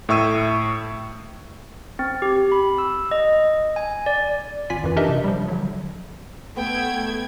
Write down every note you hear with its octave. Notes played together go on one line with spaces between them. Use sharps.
A2 E5 C#6 E6 D#7
C4
G4
B5
E6
D#5
G#5
D5
G#1 F4 D5 G#5 B6
F#2 E3
D4 D#4 G4 A#4 D#5 E5
C3
F3 G3
D3 F#3
A3 B3 G5 G#6